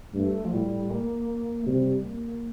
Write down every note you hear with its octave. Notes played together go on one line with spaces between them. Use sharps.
G2 A3
F3
A2 G3
A#3
A3
C3 G3
A#3